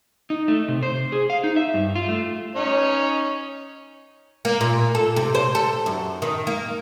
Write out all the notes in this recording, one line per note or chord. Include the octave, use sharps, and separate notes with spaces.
D#4
A3
C3
C5
G#4
F5
D#4
E5
G2
F4
A3
C#4 D#4 C#5
A#3
A#2
A4
C3
C5
A4
F#2
D#3
A#3